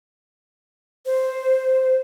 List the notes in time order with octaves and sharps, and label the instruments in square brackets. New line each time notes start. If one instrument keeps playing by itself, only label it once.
[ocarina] C5